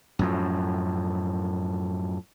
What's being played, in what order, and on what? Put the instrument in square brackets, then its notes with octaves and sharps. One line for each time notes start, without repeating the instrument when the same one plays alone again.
[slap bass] F#2 A2 F3